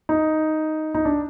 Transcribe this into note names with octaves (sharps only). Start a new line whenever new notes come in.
D#4
D#4
D4